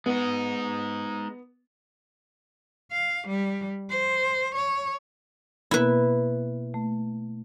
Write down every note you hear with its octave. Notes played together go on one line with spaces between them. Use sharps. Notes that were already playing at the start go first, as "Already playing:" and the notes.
G#3 B3 D#4
F5
G3
C5
C#5
B2 A#3 B3 E4 B4
A3